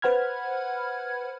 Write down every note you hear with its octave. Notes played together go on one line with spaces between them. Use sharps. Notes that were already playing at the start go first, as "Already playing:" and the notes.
B4 C5 F#5 B5 F6 G#6